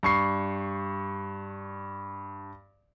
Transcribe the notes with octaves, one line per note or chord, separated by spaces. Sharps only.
G2 C#6 C7